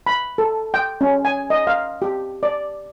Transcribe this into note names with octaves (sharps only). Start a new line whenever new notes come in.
B5
A4
G5
C#4
G#5
D#5
F5
G4
D5